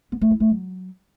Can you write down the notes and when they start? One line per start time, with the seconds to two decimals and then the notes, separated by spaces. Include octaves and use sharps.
0.12 B3
0.21 A3
0.31 E4
0.40 A3
0.50 F#3